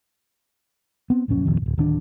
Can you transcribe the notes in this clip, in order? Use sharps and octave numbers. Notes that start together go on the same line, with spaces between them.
B3 C4
D1 A#1 F#2 C#4
D1 A#1 F2 D#3
D1 G#2
D1 D#3 D4